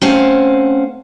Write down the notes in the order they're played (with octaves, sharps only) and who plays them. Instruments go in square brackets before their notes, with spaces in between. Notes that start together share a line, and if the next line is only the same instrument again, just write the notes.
[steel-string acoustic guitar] A3 C4 C#4 C5 F5 F#5